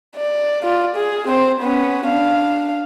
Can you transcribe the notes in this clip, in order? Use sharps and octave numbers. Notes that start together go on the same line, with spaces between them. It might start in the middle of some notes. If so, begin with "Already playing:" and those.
D5
F4 D5
G#4
C4 C5
B3 C#4
D4 F5